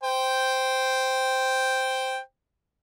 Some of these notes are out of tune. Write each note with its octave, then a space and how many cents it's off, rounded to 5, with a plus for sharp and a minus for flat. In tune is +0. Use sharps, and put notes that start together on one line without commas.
C5 +0 G5 +0